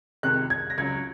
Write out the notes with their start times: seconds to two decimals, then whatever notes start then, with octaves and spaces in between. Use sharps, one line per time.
0.23 F2 C3 D#3 G#3 F#6
0.50 G#6
0.70 A#6
0.78 C#2 C#3 F#3 G#6